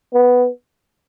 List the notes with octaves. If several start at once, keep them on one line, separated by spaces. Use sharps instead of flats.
B3